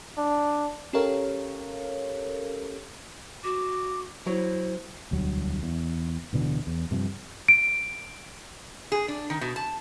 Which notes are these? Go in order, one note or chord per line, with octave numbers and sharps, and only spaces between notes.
D4
C#4 G4 A4 A#4 C#5 F5
F#4 D6
F#3 E4 C5
E1 D2 F#3 G3
E2
D1 B2 D3 E3
E2
G2 C3 F3
D7
G#4
D4
D#3
B2
A5